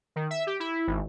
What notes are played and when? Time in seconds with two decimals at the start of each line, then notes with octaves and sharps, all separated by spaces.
0.16 D#3
0.30 E5
0.47 G4
0.60 E4
0.87 G#1